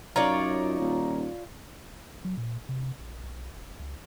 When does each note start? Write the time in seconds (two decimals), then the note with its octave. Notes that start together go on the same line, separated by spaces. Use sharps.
0.16 F#2 D#4 F4 C#5 D5 A#5
0.79 D#1
2.25 F#3
2.37 A#2
2.69 C3
3.00 A#1
3.24 B1
3.54 F1
3.80 C#2